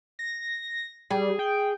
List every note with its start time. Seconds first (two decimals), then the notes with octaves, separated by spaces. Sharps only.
0.19 A#6
1.10 G3 G#4
1.39 G5